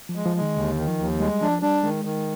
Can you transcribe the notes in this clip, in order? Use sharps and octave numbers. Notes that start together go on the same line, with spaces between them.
F3
G#3
F3
D#3 G#3
D#2 D3
D#3
F3
D#2
G3 G#3
F3 D4
G3 D4
D#3 G#3
D#3